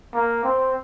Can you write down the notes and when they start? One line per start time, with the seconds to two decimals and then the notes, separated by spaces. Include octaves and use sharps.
0.14 A#3
0.44 C4